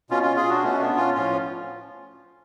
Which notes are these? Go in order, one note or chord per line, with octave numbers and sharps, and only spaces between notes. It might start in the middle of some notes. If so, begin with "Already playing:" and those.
B2 C#4 F4
C#4 F4
F4 G#4
D4 F#4
B2 A3 C#4
B3 D4
C#4 F4
A2 F3 C#4 F4